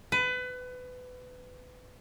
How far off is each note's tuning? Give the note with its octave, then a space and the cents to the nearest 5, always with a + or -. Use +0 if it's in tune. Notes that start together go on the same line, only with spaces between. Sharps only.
B4 +25